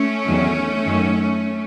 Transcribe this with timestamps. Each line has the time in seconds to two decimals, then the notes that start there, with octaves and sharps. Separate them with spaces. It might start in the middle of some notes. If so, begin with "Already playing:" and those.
Already playing: A3 C#4
0.25 E2 D#3 F#3
0.84 F#2 D#3 F#3